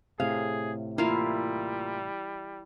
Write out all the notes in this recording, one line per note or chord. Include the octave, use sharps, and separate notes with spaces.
A2 C3 G#4 F5
G3 A#3 E4 F4